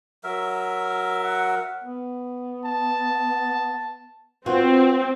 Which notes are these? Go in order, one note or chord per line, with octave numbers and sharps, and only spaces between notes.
F#3 A#4 E5
F#5
B3
A5
B3 C4 F4 F#4